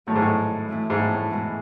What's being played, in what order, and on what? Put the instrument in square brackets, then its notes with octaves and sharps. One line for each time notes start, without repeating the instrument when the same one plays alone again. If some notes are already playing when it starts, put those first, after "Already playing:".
[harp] F#2 D#3 A3 C#4 [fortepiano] A2
[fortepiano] G#2
A2
[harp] E3 A3 C#4 E4
[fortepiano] G#2
A2
A2
[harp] E2 B2 G#3 B3 E4